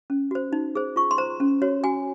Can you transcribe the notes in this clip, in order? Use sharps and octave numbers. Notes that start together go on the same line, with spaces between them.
C#4
F#4 C5
D#4
G#4 C5
F4 C#6
C6
C5 A#5
C#4
F#4 C#5
F#4 G#5